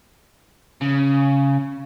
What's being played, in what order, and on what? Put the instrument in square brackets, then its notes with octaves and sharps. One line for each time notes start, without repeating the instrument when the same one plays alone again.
[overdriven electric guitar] C#3